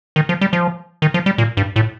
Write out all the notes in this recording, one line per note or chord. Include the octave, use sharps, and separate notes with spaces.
D#3
F3
G3
F3
D#3
F3
G3
A#2
G2
A2